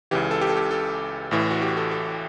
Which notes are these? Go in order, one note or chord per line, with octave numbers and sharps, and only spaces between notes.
C#2 C#3 E3 G4
A4
G4
A4
G4
A4
A1 A2 E3
F#4
G4
A4
A4